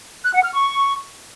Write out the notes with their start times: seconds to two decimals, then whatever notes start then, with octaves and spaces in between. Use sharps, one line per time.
0.24 F#6
0.33 F#5
0.43 F6
0.53 C#6